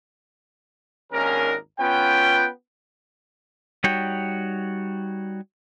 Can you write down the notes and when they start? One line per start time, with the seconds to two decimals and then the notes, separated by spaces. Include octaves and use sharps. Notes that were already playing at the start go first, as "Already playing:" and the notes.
1.12 G#1 D#2 C#4 D4 G#4 A#4
1.79 B3 C#4 F4 B4 G5
3.84 G3 D#4 F#4 C#5 G5